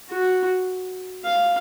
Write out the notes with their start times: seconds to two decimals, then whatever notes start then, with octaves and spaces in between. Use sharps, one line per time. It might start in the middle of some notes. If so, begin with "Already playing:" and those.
0.11 F#4
1.25 F5